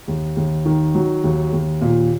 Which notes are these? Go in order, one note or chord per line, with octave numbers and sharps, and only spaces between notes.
D#2
D#2
D#3
F#3
D#2
D#2
A#2